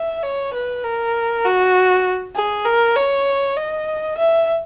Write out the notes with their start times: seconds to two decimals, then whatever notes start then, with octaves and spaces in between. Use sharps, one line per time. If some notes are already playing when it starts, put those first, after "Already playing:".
Already playing: E5
0.23 C#5
0.53 B4
0.84 A#4
1.45 F#4
2.35 G#4
2.65 A#4
2.96 C#5
3.57 D#5
4.18 E5